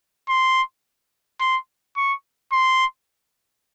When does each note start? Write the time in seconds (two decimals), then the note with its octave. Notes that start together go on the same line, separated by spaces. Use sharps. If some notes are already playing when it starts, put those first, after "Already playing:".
0.29 C6
1.40 C6
1.97 C#6
2.52 C6